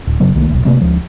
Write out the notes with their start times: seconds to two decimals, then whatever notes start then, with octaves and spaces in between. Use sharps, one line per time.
0.07 D1
0.20 F#1 C#3 F#3 B3
0.35 C2 D#3 A3 A#3
0.50 D#1 B1
0.65 C3 A3 A#3 C4
0.80 D2 F3 G#3